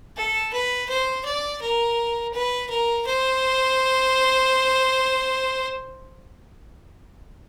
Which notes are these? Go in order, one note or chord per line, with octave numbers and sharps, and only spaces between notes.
A4
B4
C5
D5
A#4
B4
A#4
C5